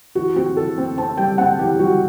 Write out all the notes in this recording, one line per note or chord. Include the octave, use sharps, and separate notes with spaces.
E3 F#4
C4 F#4
E3 A4
C4
C4 A5
G3 G5
C4 F#5
E3 G4
G3 F#4